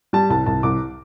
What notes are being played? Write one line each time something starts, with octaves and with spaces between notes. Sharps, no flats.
G3 A5
C2 A5
C2 A5
C2 D6